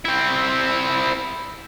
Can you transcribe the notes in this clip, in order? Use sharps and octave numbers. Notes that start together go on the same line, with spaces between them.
C4 E4